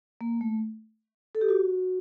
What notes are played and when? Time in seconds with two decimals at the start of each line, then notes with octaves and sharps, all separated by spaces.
0.21 A#3
0.41 A3
1.35 A4
1.41 G4
1.49 F#4